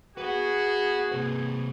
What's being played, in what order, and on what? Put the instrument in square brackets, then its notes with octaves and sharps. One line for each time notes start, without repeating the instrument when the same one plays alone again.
[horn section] F#4 [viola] G#4 [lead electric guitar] B4 F#5
[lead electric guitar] C3 B4